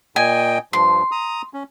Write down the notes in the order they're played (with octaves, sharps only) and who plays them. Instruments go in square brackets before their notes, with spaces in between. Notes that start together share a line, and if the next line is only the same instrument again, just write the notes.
[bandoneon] A#2 D#5 G5 [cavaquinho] G#5
[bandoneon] G2 F3 [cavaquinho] C6
[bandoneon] A#5 D#6
C#4